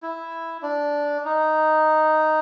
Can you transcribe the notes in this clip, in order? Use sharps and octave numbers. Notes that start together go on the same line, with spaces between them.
E4
D4
D#4